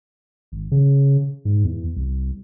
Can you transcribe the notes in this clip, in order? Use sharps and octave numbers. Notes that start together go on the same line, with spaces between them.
G#1
C#3
G#2
E2
C2